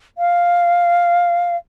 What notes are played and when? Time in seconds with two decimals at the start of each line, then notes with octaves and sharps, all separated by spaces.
0.18 F5